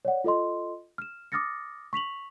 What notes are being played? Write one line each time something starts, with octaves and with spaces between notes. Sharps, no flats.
C#5 D5 F#5
F4 A4 D#5 C6
F6 E7
D6 D#6 F6 A6 A#6 C#7
C#6 B6 F7 F#7